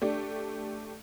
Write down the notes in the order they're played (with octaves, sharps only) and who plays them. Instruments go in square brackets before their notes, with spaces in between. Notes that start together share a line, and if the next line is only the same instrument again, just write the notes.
[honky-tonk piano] A3 D4 G4